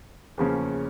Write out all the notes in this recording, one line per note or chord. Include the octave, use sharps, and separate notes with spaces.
E2 C#3 F3 A#3 C#4